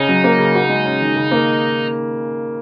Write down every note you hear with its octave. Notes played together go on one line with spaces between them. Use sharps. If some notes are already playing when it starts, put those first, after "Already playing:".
Already playing: C#3 C#4 D#4
F#3
A#3
C#3
F#4
G#3
C#4
D#3
C#3
A#3